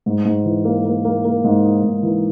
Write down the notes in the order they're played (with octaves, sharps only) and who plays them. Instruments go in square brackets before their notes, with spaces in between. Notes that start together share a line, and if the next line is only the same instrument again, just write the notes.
[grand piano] G#2
G#2
E3
A#3
A#3
A#3
A#3
G#2
D#4
G#2
E3